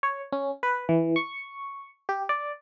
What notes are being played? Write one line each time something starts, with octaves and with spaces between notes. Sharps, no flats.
C#5
C#4
B4
E3
C#6
G4
D5